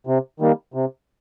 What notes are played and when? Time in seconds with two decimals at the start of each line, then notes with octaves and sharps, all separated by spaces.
0.07 C3
0.40 D#3 G3 A#3
0.74 C3